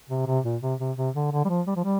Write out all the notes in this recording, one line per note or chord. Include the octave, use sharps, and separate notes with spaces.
C3
C3
A#2
C3
C3
C3
D3
D3
G3
F3
G3
F3
G3